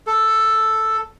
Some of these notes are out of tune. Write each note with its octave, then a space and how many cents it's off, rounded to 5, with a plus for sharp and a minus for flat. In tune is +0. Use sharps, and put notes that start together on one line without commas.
A4 +0